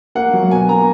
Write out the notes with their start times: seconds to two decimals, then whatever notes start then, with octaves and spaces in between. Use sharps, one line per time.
0.15 A#3 F#5
0.33 F#3
0.51 B2 G#5
0.69 A#3 A#5